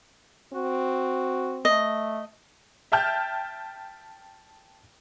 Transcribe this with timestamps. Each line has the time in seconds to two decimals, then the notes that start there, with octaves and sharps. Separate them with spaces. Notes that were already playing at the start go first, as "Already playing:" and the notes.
0.53 C4 F#4
1.65 A3 D#5
2.92 E5 G5 A5 F6 G6